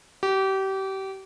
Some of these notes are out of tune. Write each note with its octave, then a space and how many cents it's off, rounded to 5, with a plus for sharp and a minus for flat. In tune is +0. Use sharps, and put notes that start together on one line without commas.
G4 -30